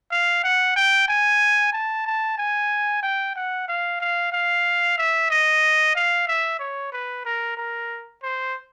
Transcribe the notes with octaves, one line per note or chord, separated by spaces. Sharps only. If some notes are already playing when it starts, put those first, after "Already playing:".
F5
F#5
G5
G#5
A5
A5
G#5
G5
F#5
F5
F5
F5
E5
D#5
F5
E5
C#5
B4
A#4
A#4
C5